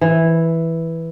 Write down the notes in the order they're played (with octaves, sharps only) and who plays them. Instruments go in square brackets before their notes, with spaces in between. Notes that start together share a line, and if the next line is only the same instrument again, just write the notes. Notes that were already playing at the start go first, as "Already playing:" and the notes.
[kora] E3